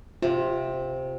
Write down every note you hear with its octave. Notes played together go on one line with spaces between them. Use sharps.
C3 F4